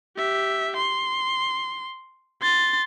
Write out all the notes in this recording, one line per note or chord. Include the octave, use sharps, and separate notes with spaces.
G4 E5
C6
C6 A6